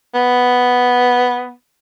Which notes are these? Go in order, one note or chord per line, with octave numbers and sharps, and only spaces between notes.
B3